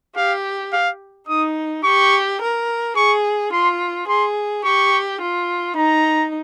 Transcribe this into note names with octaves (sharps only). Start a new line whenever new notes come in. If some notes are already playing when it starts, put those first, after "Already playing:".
G4 F5
F5
D#4 D#6
G4 C#6
A#4
G#4 C#6
F4 C6
G#4 C6
G4 C#6
F4
D#4 A#5